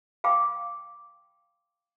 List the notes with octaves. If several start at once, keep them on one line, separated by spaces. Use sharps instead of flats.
F5 G5 B5 D6